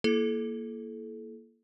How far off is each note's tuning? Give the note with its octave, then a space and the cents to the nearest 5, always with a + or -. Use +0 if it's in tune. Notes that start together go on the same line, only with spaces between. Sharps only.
A#3 +0 E4 +20 A4 -30